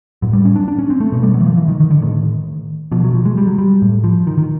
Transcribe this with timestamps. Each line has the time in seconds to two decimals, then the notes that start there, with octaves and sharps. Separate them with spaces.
0.22 A2 F#3
0.33 G3
0.45 C#4
0.56 D4
0.68 D4
0.79 C#4
0.90 C4
1.00 A3
1.12 B2 A3
1.23 G3
1.34 F#3
1.40 E3
1.46 F3
1.57 E3
1.68 D#3
1.80 D#3
1.91 D3
2.02 A2 D#3
2.92 B2 F3
3.04 F#3
3.14 F3
3.25 G#3
3.37 G3
3.47 F#3
3.58 G3
3.82 A2
4.04 F3
4.27 D#3
4.38 D#3